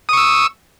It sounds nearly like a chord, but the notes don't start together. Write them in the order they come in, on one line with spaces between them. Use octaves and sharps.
D#6 C#6 E6